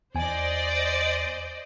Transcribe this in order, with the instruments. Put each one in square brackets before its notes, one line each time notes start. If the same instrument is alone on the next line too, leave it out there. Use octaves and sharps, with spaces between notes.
[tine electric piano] E2 G#5 [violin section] C5 D5 D#5